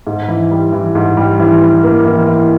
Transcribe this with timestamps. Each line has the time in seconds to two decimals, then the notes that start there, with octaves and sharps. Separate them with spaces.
0.07 G#2
0.28 E3
0.51 G3
0.72 E3
0.95 G#2
1.17 G3
1.40 E3
1.62 E3
1.84 A#3
2.05 E3
2.28 E3